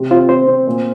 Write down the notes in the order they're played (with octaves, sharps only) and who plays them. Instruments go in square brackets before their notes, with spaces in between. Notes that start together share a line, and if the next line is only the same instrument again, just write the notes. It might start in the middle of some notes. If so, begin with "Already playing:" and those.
Already playing: [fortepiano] C3
[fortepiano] C4 [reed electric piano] F4
[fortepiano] C4 [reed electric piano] C5
[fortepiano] C4
A#2